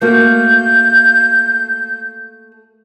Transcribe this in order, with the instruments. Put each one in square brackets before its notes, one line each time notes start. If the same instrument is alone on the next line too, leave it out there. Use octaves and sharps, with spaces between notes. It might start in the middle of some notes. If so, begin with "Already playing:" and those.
[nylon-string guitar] A3 A#3 F#4 [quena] G6